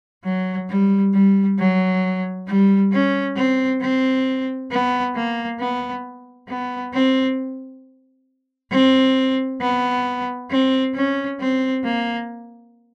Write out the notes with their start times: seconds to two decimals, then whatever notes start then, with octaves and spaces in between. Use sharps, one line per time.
0.24 F#3
0.69 G3
1.13 G3
1.58 F#3
2.47 G3
2.92 C#4
3.36 C4
3.81 C4
4.71 B3
5.15 A#3
5.60 B3
6.48 B3
6.93 C4
8.71 C4
9.61 B3
10.50 C4
10.94 C#4
11.40 C4
11.84 A#3